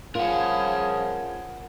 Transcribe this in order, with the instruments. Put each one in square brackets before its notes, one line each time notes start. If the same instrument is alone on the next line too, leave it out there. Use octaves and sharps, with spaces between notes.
[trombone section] C#3 F3 [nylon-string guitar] F4 [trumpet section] G#4 [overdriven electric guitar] A#4 F#5